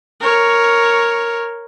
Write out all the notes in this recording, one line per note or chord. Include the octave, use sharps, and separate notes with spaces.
A#4 C#5